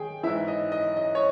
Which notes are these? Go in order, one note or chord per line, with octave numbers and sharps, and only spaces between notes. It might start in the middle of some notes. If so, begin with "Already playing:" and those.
Already playing: D#3 G#4 G5
G#2 E3 E4 E5
D#5
D#5
D#5
C#5